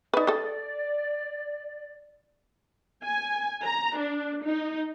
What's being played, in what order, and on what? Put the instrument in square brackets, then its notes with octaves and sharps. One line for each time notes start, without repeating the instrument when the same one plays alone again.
[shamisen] D#4 B4 [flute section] D5
[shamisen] A4 D#5
[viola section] G#5
A#5
D4
D#4